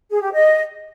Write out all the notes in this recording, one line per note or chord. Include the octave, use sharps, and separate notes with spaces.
G#4
G4
D#5